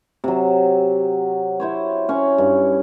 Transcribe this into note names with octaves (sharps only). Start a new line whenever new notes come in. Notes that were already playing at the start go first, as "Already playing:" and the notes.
C3 F#3
E4 C5 C#5
C#4 C#6
G2